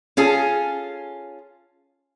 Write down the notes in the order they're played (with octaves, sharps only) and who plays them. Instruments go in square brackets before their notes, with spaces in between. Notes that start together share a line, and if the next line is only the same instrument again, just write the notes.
[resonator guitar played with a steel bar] C#4 F4 G#4 A4